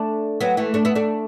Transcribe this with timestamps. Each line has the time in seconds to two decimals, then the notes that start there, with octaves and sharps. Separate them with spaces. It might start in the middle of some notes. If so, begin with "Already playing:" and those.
Already playing: A3 D4
0.41 F#3 B3
0.57 E3 A3
0.74 A3 D4
0.85 B3 E4
0.95 A3 D4